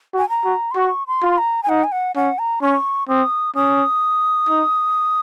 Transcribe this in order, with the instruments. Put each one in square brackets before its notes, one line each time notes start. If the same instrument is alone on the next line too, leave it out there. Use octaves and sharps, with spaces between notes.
[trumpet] F#4
[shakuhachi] G#5
A#5
[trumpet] F#4
[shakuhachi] C6
[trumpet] F#4 [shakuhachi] C#6
[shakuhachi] C6
[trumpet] F4
[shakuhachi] A#5
G#5
[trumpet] D#4 [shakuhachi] F#5
[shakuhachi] G#5
F#5
[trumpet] C#4 [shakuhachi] F#5
[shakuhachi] A#5
[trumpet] C#4 [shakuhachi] C#6
[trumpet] C4 [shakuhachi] D#6
[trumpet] C#4 [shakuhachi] D#6
[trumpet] D#4